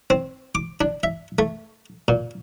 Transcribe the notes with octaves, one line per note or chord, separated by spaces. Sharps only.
C4
D6
D4
E5
A3
A#2